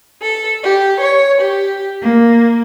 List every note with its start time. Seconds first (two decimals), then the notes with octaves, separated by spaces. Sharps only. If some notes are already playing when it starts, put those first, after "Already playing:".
0.22 A4
0.63 G4
1.00 C#5
1.41 G4
2.02 A#3